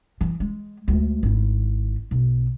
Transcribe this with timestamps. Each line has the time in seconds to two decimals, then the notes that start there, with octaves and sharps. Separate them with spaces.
0.21 E3
0.40 G#3
0.88 D2 G#3
1.23 G#1 E4
2.11 B1